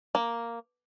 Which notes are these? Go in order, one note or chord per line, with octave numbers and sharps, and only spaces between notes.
A#3